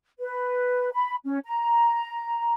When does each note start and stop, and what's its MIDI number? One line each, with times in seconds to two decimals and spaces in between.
0.19 0.90 71
0.93 1.16 83
1.25 1.38 61
1.45 2.53 82